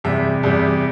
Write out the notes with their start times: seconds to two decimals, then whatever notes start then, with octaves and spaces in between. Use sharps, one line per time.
0.04 E2 C3 G3 E5
0.43 E2 C3 G3